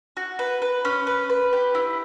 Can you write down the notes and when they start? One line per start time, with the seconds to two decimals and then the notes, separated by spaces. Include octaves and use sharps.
0.17 F#4
0.39 B4
0.62 B4
0.85 C#4
1.07 B4
1.30 B4
1.53 G4
1.75 E4